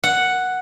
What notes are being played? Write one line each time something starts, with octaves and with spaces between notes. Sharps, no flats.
F#5